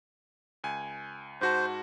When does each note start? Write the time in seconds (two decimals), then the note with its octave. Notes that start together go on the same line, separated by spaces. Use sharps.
0.64 C#2 G#5
1.41 G#2 F#4 C5 A5